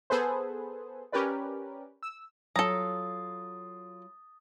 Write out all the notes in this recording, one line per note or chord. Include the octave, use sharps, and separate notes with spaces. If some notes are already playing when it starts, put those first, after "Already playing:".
B3 G#4 A4 B4 C5
C#4 G4 A#4 B4 D5
E6
F#3 F4 A4 A#5 D#6 A6